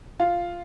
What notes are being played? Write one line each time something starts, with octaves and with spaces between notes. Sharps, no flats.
F4